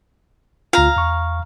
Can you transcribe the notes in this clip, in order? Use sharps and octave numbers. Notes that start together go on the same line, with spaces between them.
D2 F4 F5 A#5
E2 C#6